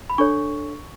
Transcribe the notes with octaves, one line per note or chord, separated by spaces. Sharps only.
B5
D4 A4 C#5 C#6